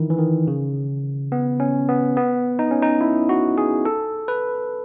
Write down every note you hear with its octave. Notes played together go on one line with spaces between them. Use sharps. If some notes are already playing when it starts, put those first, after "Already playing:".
Already playing: D#3 E3 D#4 E4
E3
D#3
C#3
B3
C#4
B3
B3
D#4
C#4
D#4
E4
F#4
G#4
A4
B4